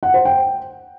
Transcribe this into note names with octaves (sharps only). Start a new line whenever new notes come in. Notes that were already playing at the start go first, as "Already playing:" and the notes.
F#5
C5
G5